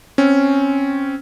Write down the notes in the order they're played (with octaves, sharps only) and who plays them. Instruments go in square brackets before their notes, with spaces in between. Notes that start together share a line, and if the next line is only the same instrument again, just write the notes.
[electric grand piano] C4 C#4